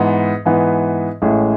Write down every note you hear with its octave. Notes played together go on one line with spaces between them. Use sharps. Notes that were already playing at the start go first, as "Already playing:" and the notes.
Already playing: G#2 E3 B3
G#2 E3 B3
A1 A2 G#3 C#4